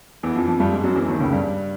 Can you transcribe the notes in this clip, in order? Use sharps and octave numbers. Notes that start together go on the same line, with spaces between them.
E2 E3
F2 F3
F2 F3
G2 G3
G#2 G#3
F#2 F#3
E2 E3
D#2 D#3
C#2 C#3
G2 G3